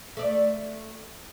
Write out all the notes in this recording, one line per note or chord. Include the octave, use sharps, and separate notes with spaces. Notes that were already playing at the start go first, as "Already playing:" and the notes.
A3 D5